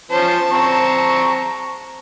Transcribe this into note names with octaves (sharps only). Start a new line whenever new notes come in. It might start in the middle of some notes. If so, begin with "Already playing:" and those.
F3 C#4 C5 A5
C4 A#5 C#6